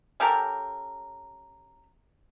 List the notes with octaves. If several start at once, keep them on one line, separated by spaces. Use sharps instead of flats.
C#4 G4 A4 A#4